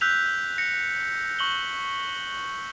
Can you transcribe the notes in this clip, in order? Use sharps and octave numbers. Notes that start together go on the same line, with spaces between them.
E6 F#6 G6 B6 F7
A#6 C#7
C#6 F#7 G7